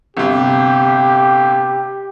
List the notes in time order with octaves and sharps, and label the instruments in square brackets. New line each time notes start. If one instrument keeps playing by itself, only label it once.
[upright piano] G1 C3 [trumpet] G4